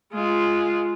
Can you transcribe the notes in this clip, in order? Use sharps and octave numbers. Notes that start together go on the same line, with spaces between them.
G#3 F4